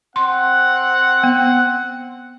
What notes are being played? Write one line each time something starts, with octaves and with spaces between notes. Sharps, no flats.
C4 F#5 C6
B3